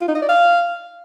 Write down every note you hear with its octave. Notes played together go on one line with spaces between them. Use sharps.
F4
D#4
D#5
D5
F5